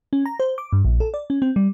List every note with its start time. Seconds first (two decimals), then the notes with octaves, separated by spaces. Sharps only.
0.13 C#4
0.26 A#5
0.40 C5
0.58 D6
0.73 G2
0.85 A#1
1.00 A4
1.14 D5
1.30 C#4
1.42 C4
1.56 G3